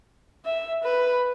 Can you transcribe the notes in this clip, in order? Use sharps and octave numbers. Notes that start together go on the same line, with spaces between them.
E5
B4